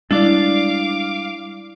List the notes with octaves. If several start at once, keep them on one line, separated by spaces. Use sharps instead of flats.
G3 G#3 D4 E4 D5 F5 D6